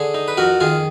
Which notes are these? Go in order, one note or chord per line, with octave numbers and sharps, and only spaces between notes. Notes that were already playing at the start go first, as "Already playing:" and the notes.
Already playing: D3 G#4
D#4
B4
F2 F#4 A#4
D#3 F4 G#4